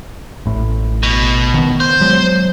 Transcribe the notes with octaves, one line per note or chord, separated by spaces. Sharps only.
A1 A2
B2
D#3 B3
C5
F#3 G#3